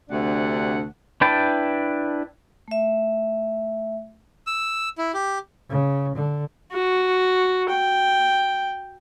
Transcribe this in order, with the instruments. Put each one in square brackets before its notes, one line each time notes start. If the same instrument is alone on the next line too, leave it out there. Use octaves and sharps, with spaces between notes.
[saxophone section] D2 C3 A3 D4 F#5
[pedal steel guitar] D4 E4 B4 G5 A5
[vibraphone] A3 E5
[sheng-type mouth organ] E6
E4
G4
[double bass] C#3
D3
[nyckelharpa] F#4
G5